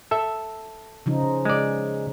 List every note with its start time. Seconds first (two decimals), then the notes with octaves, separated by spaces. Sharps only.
0.11 A4 E5
1.06 C#3 F3 D#4
1.45 G#3 D5